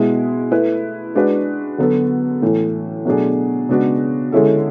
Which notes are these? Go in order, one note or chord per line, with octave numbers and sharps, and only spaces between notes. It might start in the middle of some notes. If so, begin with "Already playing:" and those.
Already playing: B2 G#3 B3 E4
A3 E4 B4
G#3 D4 F#4 B4
D3 F#3 B3 F#4 A4
A2 E3 A3
B2 F#3 A3 D4 G#4
C#3 G#3 B3 D4 F#4
D3 G#3 C#4 E4 A4